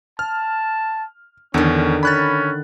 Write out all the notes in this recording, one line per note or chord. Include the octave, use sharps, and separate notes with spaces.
A5 F6
E2 D3 D#3 C#4
C#4 B5 F#6 A6